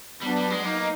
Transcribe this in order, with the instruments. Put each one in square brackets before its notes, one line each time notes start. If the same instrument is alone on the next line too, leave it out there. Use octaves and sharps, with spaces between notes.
[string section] F#3 B3 D4 [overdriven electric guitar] G3
[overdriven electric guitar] G3
G#3
[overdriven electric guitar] A#3 [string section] D#4